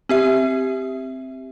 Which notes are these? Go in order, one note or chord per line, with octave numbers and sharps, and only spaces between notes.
C4 G4 E5